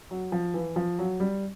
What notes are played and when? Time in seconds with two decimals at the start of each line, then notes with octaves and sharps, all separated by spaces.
0.11 F#3
0.32 F3
0.54 E3
0.76 F3
0.99 F#3
1.20 G3